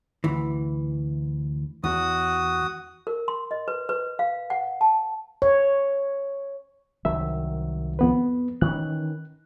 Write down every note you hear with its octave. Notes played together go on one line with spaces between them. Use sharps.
D2 E3
E2 F#4 D#6
A#4
C6
D#5
B4
B4
F5
F#5
A5
C#5
C2 D#3 F#3 E5
F2 B3 B4
D#3 E3 C#4 F#6